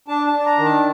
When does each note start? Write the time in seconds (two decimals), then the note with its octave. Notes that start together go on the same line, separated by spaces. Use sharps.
0.08 D4 A5
0.27 A5
0.33 D4
0.39 A5
0.46 A#5
0.58 D#3
0.65 A5